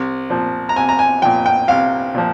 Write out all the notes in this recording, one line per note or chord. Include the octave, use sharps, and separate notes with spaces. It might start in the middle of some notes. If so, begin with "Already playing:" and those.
Already playing: C2
A#2 F3
A#5
C2 G#5
A#5
G#5
A#2 F3 G5
G5
C2 F5
A#2 F3